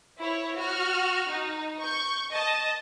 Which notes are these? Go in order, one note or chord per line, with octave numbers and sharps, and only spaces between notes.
E4 C#5
F#4 F6
D#4
C#6 G6
D#5 A5